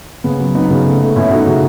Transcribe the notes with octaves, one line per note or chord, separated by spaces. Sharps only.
C#3 B3
F#3
F#3 B3 D#4
C#3
A3
A3
B2 C#4 E4
A3 D#4 F#4
C#3